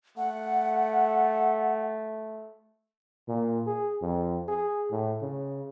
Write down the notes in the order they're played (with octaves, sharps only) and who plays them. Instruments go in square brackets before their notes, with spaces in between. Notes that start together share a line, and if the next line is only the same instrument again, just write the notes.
[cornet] A3 [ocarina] F#5
[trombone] A#2
G#4
F2
G#4
A2
C#3